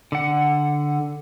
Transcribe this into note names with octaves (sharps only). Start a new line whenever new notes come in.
D3 F#5